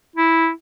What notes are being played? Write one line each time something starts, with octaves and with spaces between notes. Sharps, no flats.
E4